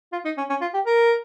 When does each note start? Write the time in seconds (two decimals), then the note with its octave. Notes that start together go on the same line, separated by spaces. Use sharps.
0.13 F4
0.25 D#4
0.38 C#4
0.50 C#4
0.61 F4
0.74 G4
0.86 A#4